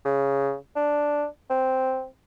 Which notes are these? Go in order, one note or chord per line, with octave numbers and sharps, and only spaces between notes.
C#3
D4
C4